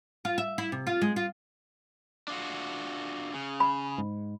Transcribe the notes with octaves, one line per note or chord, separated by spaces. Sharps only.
F4
E5
E4
C3
F4
G#3
F4
D4 F4 F#4
C#3
B5
G#2